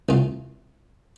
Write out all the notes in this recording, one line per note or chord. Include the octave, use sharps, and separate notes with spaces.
C2 F4